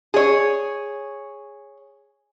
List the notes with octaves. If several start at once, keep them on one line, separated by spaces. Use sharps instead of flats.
G#4 C#5